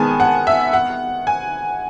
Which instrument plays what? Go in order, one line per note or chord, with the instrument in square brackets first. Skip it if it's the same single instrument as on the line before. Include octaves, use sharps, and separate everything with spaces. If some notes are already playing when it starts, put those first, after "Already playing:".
Already playing: [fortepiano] D#3 G#3 B3 [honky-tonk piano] G#5 A5
[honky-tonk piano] F#5
E5
F#5
G#5